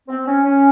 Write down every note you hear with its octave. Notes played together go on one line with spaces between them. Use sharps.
C4
C#4
C#4